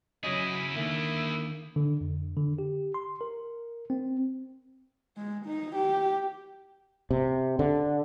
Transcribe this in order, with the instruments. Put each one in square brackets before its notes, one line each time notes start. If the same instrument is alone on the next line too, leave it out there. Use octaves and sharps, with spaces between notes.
[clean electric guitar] C#3 C#4 F#4 [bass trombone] F#3 [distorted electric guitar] E4 G#4 [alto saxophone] D#5
[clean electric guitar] D#2 D3 D#3 [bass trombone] A#3 [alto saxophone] E5
[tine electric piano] D3
F2
D3
G4
C6
A#4
C4
[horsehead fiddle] G#3
D#4
G4
[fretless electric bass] C3
D3